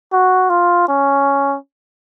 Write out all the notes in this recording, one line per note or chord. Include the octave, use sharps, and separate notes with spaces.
F#4
F4
C#4